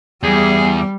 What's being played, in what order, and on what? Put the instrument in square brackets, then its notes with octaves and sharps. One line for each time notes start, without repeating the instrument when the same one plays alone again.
[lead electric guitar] E2 [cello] G3 [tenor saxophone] G#4